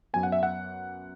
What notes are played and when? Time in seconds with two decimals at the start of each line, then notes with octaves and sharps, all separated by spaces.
0.13 F#2 F#3 B3 G#5
0.23 F#5
0.32 E5
0.43 F#5